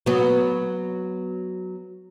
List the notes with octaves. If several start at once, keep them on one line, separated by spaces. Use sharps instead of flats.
F#3 B3